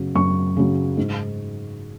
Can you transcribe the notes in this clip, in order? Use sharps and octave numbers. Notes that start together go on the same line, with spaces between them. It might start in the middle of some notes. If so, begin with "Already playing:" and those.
Already playing: F#2 C#3 F#3
F#2 C#6
C#3 F#3
G#2